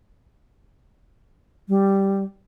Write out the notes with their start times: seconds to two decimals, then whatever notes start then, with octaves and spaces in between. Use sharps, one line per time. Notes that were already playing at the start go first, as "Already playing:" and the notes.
1.69 G3